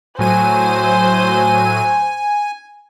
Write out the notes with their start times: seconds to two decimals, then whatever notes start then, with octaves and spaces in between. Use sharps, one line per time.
0.19 A2 F#3 C5 G#5 D#7